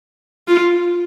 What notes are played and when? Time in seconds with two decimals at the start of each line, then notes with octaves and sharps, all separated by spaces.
0.48 F4